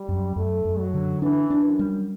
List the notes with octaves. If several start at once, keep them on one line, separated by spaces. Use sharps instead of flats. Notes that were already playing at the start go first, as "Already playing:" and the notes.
Already playing: G3
F#2
F#2 A3
F#2
F#3
D3
E3 D4
D4
F#2
G3